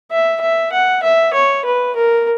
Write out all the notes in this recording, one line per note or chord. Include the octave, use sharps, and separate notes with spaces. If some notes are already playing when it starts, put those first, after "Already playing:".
E5
E5
F#5
E5
C#5
B4
A#4